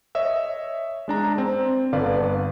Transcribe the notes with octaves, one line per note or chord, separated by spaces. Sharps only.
C#5 D#5 E5 E6
G#3 D4 A#5
C4
G1 D3 B4 D5 F5